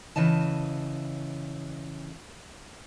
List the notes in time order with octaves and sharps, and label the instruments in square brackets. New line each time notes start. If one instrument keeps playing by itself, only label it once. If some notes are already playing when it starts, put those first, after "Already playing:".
[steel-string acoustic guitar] C#3 E3 D#5 A5